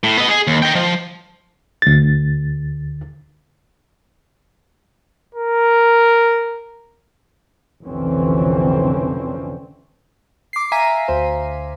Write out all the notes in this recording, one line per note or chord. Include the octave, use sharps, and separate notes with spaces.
A2
B3 D#5
G#4
D#2
D#5 G5
F3
D2 A6
A#4
F1 B1 D3 E3 C4 C#4
D6 C7
E5 F5 G#5 A#5 B6 D#7
D2 C5